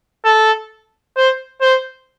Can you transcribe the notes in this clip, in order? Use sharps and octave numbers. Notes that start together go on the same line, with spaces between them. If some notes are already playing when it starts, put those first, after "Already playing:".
A4
C5
C5